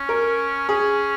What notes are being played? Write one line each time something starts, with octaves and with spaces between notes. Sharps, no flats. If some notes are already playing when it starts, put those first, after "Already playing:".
Already playing: C#4
A#4
C#4 G#4